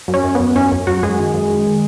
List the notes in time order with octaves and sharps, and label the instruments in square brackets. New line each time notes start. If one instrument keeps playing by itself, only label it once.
[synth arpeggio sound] F#2
C#4
F#2
F#2 B3
F#2 C#4
F#2
F#2 F#3 F#4
F#2 G#3 G#4
D#3
F#2
D#3
D#3